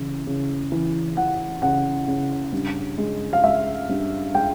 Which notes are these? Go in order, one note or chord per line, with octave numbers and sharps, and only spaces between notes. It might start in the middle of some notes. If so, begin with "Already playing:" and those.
Already playing: C#3 E3
C#3
E3
E3 F#5
C#3 F#5
C#3
G2
G#3
F5
G#3 E5
G2
G#3 G5